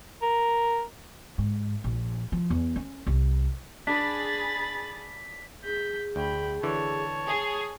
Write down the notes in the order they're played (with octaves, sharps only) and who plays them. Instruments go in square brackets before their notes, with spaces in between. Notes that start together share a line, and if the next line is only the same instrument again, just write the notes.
[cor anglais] A#4
[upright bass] G#2
A#1
F3
E2
C#4
C2
[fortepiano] D4 [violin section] G#4 B5 A6 [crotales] B6
[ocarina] G#4 [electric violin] G6 B6
[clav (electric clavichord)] D2 [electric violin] G5 B5
[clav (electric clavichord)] D3 E3 [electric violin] C#5 A5
[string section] G#4